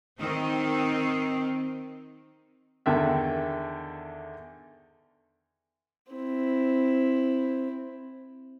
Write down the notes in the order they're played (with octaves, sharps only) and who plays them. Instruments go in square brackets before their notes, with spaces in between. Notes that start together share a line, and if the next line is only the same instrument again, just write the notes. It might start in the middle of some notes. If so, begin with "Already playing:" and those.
[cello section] D#3 C4
[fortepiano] E2 D3 D#3 E5
[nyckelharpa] C4 E4